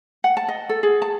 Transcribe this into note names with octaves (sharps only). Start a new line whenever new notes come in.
F#5
A5
D#5
A4
G#4
A5